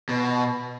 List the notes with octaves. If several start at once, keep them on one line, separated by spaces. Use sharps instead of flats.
B2